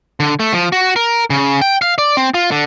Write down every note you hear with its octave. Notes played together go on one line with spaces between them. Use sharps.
D3
A3
F3
F#4
A#4
C#3
G5
F5
D5
C4
F4
D3